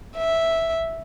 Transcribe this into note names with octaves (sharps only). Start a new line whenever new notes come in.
E5